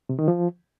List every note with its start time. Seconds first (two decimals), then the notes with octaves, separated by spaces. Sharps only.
0.09 C3
0.19 D#3
0.28 F3